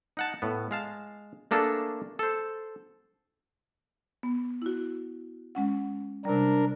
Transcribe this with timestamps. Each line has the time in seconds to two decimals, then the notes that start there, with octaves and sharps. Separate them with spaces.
0.17 D#4 F#5 A5
0.42 A2 B3
0.71 G#3 F5 A5
1.51 A3 A#3 D4 G#4 A4 B4
2.19 A4 C5
4.23 B3
4.62 E4 F#4
5.55 G#3 C#4 F#5
6.25 C3 G3 D4 A#4